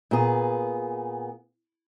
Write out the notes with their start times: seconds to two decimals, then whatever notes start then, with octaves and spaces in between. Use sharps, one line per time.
0.11 A#2 B3 G#4